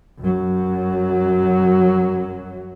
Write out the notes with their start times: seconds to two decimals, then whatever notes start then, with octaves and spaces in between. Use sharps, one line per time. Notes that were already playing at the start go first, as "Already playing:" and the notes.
0.20 F#2 F#3